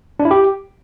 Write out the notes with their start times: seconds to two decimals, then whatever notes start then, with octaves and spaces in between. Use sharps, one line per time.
0.20 D4
0.25 E4
0.31 G4